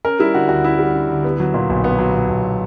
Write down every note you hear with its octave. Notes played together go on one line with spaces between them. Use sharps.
C#4 A#4
G3 E4
D3 F#4
D2 F#4
C#4 E4
G3
D3
D2
B3
F#3
A#2
B1
B3
F#3
A#2
B1